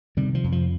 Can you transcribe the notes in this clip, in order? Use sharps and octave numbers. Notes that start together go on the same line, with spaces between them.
C3 D#3 G3
F3
F2
F3